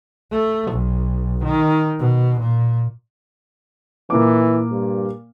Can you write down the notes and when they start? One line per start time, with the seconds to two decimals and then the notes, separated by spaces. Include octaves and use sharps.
0.32 A3
0.71 B1
1.44 D#3
1.99 B2
2.40 A#2
4.10 A#2 E3 A#3 D6
4.71 G2